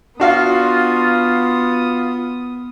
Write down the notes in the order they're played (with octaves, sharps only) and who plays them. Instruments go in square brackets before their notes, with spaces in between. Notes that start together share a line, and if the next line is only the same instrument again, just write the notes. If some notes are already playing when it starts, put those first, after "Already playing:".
[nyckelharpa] B3 D#6 [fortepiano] D4 F#4 F5 [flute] F4